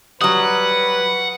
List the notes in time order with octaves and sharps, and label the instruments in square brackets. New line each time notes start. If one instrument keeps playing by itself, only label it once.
[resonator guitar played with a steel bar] F#3 G3 [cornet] B4 [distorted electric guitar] F#5 [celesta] D#6